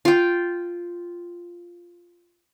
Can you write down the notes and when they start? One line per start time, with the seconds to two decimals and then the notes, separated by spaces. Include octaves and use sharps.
0.05 F4 G5